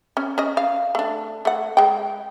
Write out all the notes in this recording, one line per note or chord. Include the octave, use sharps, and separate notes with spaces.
C#4
C#4 D#5
F5
A3 D4
A3 F#5
G#3 G5